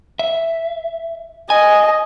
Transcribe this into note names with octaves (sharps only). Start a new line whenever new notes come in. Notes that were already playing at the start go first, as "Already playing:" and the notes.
E5
D#5 G#5